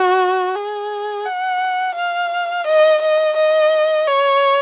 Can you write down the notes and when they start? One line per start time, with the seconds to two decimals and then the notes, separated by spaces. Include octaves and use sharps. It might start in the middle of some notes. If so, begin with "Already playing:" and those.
Already playing: F#4
0.55 G#4
1.26 F#5
1.96 F5
2.67 D#5
3.02 D#5
3.37 D#5
4.07 C#5